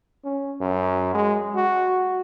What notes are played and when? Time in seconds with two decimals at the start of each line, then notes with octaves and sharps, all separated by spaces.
0.25 C#4
0.61 F#2
1.14 G#3
1.55 F#4